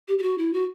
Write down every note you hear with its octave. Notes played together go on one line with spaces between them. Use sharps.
G4
G4
F#4
E4
F#4